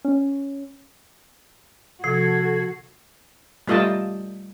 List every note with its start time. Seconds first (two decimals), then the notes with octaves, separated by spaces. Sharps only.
0.05 C#4
2.04 C3 F3 F#4 A4 G#6 C7
3.68 G3 A3 F4 D#5 G5 A5